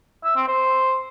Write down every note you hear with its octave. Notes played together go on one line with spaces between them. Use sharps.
E5
C4
C5